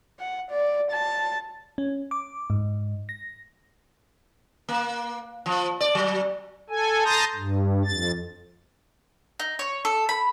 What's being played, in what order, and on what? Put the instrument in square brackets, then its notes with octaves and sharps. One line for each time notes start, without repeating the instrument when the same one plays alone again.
[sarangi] F#5
D5
A5
[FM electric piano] C#4
D6
G#2
A#6
[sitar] A#3
F3
D5
F#3
[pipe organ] A4 G#5
A5 A#5 C6 D#6 G6 A#6
G2
F2 A6
[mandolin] D#4
C#5
A4
B5